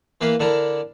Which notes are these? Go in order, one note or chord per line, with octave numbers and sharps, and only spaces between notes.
E3 A#3 B4 F5
D3 D4 E4 A#4